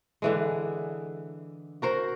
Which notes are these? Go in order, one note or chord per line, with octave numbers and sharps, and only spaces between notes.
D3 E3 G#3
F#4 A#4 C5